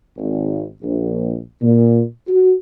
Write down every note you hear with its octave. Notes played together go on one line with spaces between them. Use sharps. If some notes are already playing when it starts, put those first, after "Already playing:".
G#1
A#1
A#2
F#4